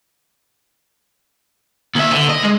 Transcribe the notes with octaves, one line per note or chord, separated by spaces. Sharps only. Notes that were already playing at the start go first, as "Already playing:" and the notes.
D#2 E5
D3
D#5
G#3